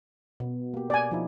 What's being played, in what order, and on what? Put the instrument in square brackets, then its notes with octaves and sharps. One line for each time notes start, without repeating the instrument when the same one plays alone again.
[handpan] B2
A#3 G4
[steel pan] D5 G#5
[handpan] F3 D#4 E4